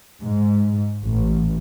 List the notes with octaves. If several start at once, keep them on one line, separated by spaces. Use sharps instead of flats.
G#2
A1